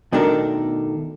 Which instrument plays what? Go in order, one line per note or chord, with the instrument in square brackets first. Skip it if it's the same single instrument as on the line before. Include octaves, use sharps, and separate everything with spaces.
[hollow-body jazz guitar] B2 D#3 A3 D4 A4 A#4